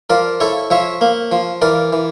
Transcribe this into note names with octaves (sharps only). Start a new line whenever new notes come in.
F3 A#4 D5
E4 A4 C#5
F3 C#5 E5
A#3
F3
E3 A#4 D5
E3